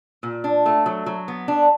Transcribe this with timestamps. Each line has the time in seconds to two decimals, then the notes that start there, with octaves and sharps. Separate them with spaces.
0.23 A#2
0.44 D4
0.66 A3
0.86 F#3
1.06 F#3
1.28 B3
1.48 D4